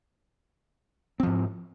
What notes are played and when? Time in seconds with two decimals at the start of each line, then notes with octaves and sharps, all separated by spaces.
1.20 C4
1.23 F3
1.27 G#2